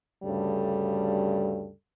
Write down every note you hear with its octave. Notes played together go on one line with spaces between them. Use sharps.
D2 G2 C#3 G3 A4